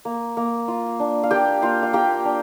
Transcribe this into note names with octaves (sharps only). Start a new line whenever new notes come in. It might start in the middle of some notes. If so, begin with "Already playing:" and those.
A#3
A#3
F4
D4
F5
A#3 G4 G5
A#3 F4 F5
F5
A#3 G4 G5
D4